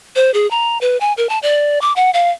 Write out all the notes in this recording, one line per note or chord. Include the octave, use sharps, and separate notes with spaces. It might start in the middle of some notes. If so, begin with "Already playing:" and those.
C5
G#4
A#5
B4
G#5
A#4
A5
D5
D6
F#5
F5